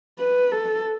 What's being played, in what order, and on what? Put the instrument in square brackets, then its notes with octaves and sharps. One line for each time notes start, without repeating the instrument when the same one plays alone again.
[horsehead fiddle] B4
A4